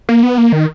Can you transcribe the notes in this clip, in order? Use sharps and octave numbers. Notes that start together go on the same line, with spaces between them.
A#3
B3
A#3
D#3